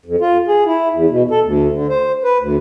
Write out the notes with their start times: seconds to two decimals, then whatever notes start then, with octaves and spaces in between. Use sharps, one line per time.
0.06 F2
0.21 F4
0.48 G#4
0.66 E4
0.93 E2
1.10 B2
1.31 A4
1.44 D2
1.72 D3
1.90 C5
2.24 B4
2.40 D2